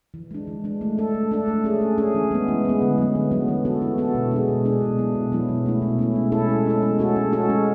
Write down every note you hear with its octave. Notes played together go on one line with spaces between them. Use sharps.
E3
G#3 D4
E3
G#3 D4
A3
D4 A4
A3
D4 A4
A3
C#4 G#4
A3
C#4 G#4
E3
G#3 B3
E3
G#3 B3
D3
F#3 B3
D3
F#3 B3
E3
B3 F#4 A4
E3
B3 F#4 A4
B2
G#3 D4 G#4
B2
G#3 D4 G#4
B2
F#3 B3 E4
B2
F#3 B3 E4
B2
A3 C#4 E4
B2
A3 C#4 E4
G#3
C#4 E4 A4
G#3
C#4 E4 A4
G#3
C#4 F#4 A4
G#3
C#4 F#4 A4
G#3